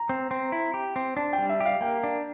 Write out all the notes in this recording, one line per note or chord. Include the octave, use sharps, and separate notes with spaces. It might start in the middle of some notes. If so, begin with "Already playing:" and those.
Already playing: A#5
C4
C4
E4
G4
C4
D4 A5
G5
G3
E5
G4
F5
A#3 G5
D4